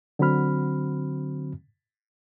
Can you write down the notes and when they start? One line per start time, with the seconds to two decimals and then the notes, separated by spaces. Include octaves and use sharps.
0.19 D3 F#3 C4 F#4 B5 F6